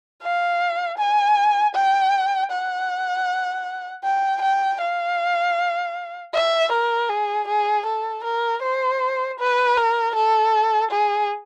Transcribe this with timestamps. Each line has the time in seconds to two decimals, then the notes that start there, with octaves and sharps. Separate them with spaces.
0.22 F5
0.98 G#5
1.75 G5
2.51 F#5
4.04 G5
4.42 G5
4.81 F5
6.33 E5
6.72 A#4
7.09 G#4
7.48 G#4
7.86 A4
8.24 A#4
8.62 C5
9.39 B4
9.77 A#4
10.15 A4
10.91 G#4